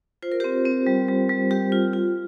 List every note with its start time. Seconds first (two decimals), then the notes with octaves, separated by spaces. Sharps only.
0.22 F4 C5
0.32 A#4
0.40 C4 G4 C5
0.65 C4
0.87 G3
1.08 G3
1.29 G3
1.51 G3 G4
1.72 F4
1.93 F4